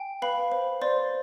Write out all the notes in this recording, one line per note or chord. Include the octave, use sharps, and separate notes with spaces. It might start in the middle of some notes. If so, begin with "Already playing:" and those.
Already playing: G5 G#5
B4 F5 B5
C5
C5 D5 C6